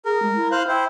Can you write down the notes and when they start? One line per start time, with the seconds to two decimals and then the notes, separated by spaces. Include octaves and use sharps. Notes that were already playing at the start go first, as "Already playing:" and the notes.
0.05 G#4 A#4
0.22 G#3
0.36 E4
0.52 C5 F5 F#6
0.68 E4 C5 G5